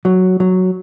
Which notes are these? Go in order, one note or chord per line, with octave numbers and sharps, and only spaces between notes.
F#3
F#3